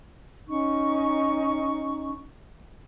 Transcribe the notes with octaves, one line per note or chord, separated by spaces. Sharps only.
C#4 D#4 C#6